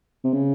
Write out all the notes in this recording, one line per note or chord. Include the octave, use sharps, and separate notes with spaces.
C3
C#3